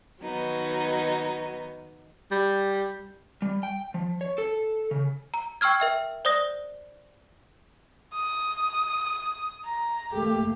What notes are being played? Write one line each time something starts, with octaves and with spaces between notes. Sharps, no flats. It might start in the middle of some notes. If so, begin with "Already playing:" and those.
D#3 F#3 B3 D#4
G3
G3
G5
F3
C#5
A4
C#3
A#5
G5 C#6 E6 F6 G#6
A#4 E5 G5
C5 D5 D#6 A#6
D#6
A#5
A3 A#3 G4